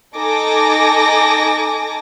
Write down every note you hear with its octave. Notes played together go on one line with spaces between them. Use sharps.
D#4 A4 G#5 A5 D6 A#6